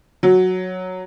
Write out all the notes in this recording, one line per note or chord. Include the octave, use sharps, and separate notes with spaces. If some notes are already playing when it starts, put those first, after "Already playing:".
F#3